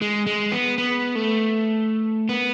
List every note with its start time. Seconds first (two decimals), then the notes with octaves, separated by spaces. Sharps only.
0.02 G#3
0.26 G#3
0.52 B3
0.78 B3
1.15 A3
2.29 B3